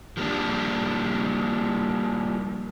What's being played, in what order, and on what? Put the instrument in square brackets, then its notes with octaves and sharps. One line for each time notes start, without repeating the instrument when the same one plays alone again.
[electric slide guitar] F3 G3 A#3 D4